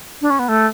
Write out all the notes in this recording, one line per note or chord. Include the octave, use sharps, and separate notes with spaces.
D4
C#4
B3
A3